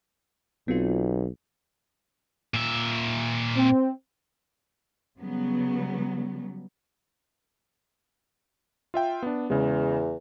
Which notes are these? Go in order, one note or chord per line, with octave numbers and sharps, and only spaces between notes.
B1 B3 C4 F4
A#2 E5
C4
C#3 F#3 G3 B3
F4 E5 G5
B3 D4
E2 C#3 G#3